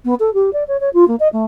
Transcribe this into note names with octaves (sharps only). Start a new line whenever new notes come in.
B3
A4
G4
D5
C#5
C#5
F4
A#3
D#5
A3